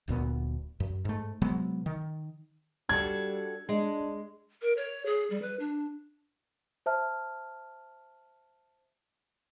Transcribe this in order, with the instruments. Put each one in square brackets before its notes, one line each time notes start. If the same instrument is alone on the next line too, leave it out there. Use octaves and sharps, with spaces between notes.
[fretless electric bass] D1 D2 A#2 B3
F#2
G#2 A3
C3 F#3 G#3 B3
D#3
[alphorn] G3 [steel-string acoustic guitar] D4 F#4 A4 [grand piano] G#6
[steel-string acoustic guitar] G#3 [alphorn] D4
[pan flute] A#4
C#5
G#4
G3
B4
D4
[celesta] C5 E5 A5 F6